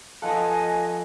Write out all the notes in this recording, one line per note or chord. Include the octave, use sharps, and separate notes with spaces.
F3 A4 B4 D#5 F5 F#5 G#5